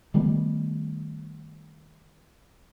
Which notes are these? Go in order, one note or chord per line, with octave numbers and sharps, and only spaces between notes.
D#3 G3 A3 B3